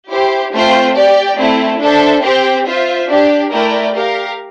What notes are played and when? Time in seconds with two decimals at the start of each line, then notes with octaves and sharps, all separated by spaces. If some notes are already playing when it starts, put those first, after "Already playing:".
0.10 E4 G4 C5
0.53 A3 C4 F4 C5 G5
0.95 G4 D5 G5
1.38 A3 C4 E4
1.81 D4 A4 C5 E5
2.23 C4 G4 C5 G5
2.66 F4 C5 E5
3.08 D4 G4 D5
3.50 A3 E4 A#4 D5 G5
3.92 G4 A#4 F5